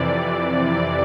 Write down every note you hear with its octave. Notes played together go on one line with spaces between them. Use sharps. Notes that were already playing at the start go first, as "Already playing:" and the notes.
Already playing: F2 C3 E3 D5
D5